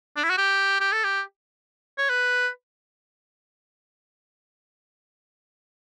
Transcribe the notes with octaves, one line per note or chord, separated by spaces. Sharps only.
D4
E4
F#4
G4
G4
A4
G4
C#5
B4